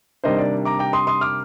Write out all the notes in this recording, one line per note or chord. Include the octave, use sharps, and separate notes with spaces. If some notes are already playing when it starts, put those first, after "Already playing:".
C3 D#3 G3 A#3 D4 C5 D#5
D5
A#5 D6
G5 A#5
C6 D#6
C6 D#6
D6 F6